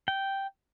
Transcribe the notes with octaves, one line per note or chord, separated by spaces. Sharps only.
G5